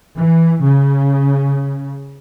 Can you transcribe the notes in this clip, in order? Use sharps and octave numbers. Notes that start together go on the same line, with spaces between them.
E3
C#3